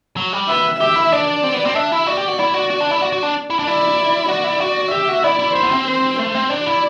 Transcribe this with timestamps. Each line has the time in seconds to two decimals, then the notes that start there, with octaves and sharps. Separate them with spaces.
0.17 F#3
0.33 G3
0.49 B3 E5
0.81 G4 E5
0.96 E4
1.12 D4 D5
1.43 C4
1.54 B3
1.65 C4
1.75 D4 E5
1.92 E4
2.07 F#4 D5
2.17 G4
2.28 F#4
2.38 E4 D5
2.54 F#4
2.70 F#4
2.80 D4
2.91 E4
3.02 F#4
3.13 F#4
3.23 D4
3.50 E4
3.59 D4
3.66 E4 D5
4.28 F#4 D5
4.44 E4
4.61 F#4
4.92 G4 E5
5.09 F#4
5.24 E4 D5
5.39 E4
5.55 E4 C5
5.63 B3
5.72 C4
5.87 C5
6.19 A3 C5
6.34 C4
6.50 D4 D5
6.66 E4